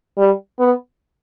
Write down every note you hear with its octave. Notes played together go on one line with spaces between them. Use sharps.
G3
B3